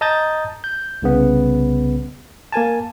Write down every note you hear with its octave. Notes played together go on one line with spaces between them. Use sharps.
D#5 A5 A#5 D#6 G6 A6
G6
C2 C#3 B3
A#3 A#4 G#5 A5